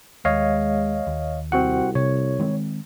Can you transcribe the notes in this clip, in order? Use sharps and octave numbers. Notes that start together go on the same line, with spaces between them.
D#2 G#3 C#5 D#5 F5
D#2
C2 C4 F#4 F#5
C3 C#5
D#3 G#3 C4